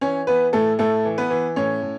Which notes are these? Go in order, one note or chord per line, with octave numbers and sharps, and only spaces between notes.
E3 C#4 C#5
E3 B3 B4
A2 A3 A4
A2 A3 A4
E3
B3 B4
E3
A2 C#4 C#5
A2